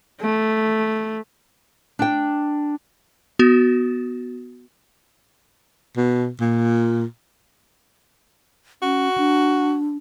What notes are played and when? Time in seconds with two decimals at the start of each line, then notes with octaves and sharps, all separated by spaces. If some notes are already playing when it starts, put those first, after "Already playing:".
0.21 A3
1.99 D4 G5
3.39 B3 F#4
5.97 B2
6.40 A#2
8.82 C#4 F#4
9.18 D4